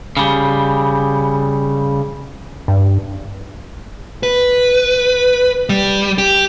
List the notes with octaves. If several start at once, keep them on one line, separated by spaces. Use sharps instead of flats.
C#3 G3
G2
B4
G3
G4